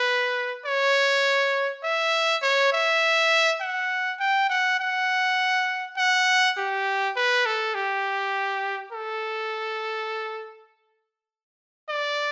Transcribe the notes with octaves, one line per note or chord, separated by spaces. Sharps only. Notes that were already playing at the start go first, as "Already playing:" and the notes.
Already playing: B4
C#5
E5
C#5
E5
F#5
G5
F#5
F#5
F#5
G4
B4
A4
G4
A4
D5